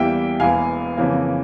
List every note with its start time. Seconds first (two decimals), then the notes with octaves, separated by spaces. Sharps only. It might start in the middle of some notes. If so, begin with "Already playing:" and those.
Already playing: E2 E3 G3 A#3 E5 G5
0.40 E1 E2 E3 A#3 F5 G#5
0.97 F2 C#3 E3 A#3